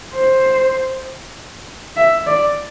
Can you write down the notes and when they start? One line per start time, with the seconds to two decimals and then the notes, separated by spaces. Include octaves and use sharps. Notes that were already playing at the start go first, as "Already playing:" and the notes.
0.14 C5
1.97 E5
2.26 D5